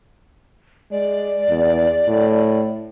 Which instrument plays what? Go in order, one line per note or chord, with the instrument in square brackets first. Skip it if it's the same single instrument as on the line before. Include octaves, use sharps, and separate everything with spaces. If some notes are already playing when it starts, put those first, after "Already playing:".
[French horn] G#3 [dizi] D5
[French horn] E2
A2